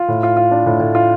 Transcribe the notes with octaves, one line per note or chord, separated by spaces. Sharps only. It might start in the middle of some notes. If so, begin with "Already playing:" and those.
Already playing: F4
A2
F4
F4
D4
A2
A2
F4